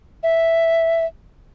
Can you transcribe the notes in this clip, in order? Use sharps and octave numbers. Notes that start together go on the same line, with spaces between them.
E5